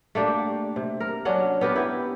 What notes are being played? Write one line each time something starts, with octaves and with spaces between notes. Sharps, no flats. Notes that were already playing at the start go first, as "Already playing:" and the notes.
A3 A#3 D4 G4
C3
A#4
F#3 C#4 D4 F#5
B3 G4 A#4 B4
E4 G4